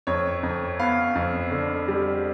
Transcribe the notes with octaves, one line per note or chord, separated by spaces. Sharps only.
F2 C#5
F2
B3 F5
F2
D3
G3